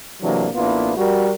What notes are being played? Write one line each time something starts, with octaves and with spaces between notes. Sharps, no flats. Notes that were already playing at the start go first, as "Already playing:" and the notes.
C3 E3 F#3 A3 A#3 D4
A1 A#3 B3 D4 E4 F4
G3 F#4 A#4